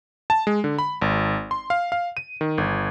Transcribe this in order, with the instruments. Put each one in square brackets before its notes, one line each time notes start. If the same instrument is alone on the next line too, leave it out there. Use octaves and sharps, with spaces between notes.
[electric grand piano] A5
G#3
D3
B5
G#1
C6
F5
F5
D#7
D#3
G1